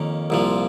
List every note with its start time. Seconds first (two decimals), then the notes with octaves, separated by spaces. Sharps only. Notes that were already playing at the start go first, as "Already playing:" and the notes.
Already playing: F2 D#3 A#3 C#4
0.30 C2 A#2 F3